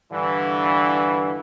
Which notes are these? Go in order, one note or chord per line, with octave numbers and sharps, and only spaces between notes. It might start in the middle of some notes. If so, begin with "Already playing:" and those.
G2 D3 E3